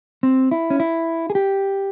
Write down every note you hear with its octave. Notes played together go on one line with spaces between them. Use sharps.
C4
E4
C#4
E4
G#4
G4